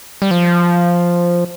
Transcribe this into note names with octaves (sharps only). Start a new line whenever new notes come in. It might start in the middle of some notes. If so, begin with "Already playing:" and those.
G3
F3